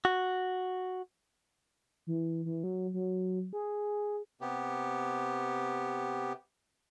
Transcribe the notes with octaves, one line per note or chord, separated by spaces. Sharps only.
F#4
E3
E3
F#3
F#3
G#4
C3 B3 G4